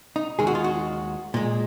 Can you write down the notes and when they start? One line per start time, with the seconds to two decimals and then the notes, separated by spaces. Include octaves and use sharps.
0.16 D#4
0.39 D#2 D#3 G#3 G#4
0.47 F#4
0.55 F4
0.64 F#4
1.34 A#2 G#3